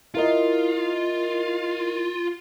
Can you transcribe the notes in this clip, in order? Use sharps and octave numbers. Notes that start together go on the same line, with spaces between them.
E4 F4 A#4 D#5